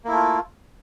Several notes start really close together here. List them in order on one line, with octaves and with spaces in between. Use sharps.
A#3 E4 A3 F4